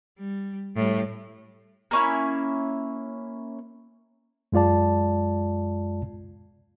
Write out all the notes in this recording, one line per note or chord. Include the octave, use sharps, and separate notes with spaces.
G3
A2 G3
A#3 C#4 E4
F#2 G#3 F4 D5 A5